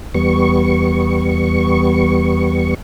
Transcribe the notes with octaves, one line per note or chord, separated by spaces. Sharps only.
E2 G3 B3 C#6